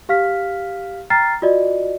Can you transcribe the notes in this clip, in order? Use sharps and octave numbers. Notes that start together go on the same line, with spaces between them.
G4 F5 F6 B6
G5 A#5 F6 A6 C7
F4 F#4 D5 D#5